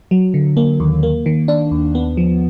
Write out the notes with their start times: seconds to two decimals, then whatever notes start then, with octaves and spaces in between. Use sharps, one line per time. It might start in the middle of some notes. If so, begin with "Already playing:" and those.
0.11 F#3
0.34 D3
0.57 A#3
0.80 D#2
1.03 A#3
1.26 D#3
1.48 D4
1.71 D#2
1.95 B3
2.17 F3